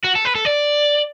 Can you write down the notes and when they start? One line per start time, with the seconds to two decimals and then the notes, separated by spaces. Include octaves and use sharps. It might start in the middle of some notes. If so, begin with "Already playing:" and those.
0.04 F#4
0.15 A4
0.25 B4
0.35 A4
0.45 D5